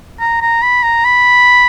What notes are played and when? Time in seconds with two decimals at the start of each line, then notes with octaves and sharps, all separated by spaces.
0.20 A#5
0.42 A#5
0.63 B5
0.83 A#5
1.05 B5